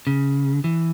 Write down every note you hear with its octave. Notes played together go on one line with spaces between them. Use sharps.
C#3
E3